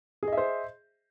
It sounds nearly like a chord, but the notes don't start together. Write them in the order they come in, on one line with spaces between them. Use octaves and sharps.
G#4 D#5 E5 C5